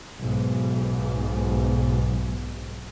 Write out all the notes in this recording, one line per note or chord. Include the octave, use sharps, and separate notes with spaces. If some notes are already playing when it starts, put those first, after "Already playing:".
B1 G#2